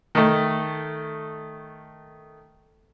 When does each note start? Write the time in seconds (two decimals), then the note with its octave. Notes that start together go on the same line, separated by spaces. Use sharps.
0.15 D#3 A3